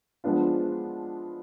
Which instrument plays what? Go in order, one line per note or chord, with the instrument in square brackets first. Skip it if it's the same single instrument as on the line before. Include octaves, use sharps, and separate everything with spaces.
[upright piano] F3 G#3 B3 D4 F4